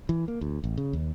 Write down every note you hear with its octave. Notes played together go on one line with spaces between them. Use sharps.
E3
A#3
D2
A1
C#3
D#2